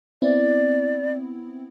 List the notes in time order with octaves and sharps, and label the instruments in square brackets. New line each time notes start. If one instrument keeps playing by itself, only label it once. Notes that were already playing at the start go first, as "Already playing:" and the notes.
[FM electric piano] B3 C4 E4 [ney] D5